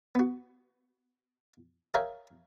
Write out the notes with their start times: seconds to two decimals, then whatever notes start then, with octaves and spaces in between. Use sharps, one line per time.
0.15 B3 F#4
1.94 G#4 A#4 C#5 E5 F5 G5